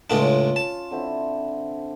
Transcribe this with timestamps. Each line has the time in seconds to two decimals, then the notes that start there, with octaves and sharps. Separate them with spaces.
0.10 C#2 A2 C#4 D4 F4
0.56 A5
0.91 D3 C4 E4